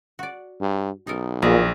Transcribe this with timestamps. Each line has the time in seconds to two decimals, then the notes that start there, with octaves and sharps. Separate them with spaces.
0.19 F#4 D5
0.60 G2
1.07 B1 D#4 A4 A#4
1.42 A#1 A#2 G#4